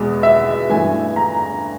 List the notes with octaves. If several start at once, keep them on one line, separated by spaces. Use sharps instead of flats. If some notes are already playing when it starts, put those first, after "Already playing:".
Already playing: E2 B2 G#3
E5
G2 E3 A3 G#5
A#5